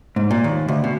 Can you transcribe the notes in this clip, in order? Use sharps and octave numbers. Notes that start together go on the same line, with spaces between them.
G#2
A#2
D#2
D2
B2